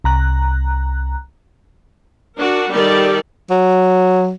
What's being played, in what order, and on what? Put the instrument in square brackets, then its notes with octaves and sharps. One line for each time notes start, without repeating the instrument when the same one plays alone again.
[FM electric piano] C2 A#5 F#6
[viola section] D4 F#4 A#4
D#3 G3 G4 A4 D5
[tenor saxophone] F#3